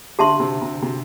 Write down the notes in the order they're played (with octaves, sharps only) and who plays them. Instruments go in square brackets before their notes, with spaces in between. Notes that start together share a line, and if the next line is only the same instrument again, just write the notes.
[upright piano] D3 [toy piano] G4 E5 A5 C6
[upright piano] C3
C3
C3